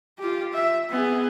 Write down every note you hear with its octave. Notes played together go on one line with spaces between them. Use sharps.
F4 G4
E5
B3 G#4